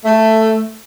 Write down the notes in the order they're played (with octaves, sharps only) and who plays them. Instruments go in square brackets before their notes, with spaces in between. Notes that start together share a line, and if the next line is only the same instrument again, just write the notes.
[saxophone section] A3